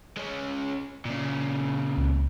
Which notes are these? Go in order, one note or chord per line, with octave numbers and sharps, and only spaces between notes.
G#3 C#4
A#2 C#3
C#2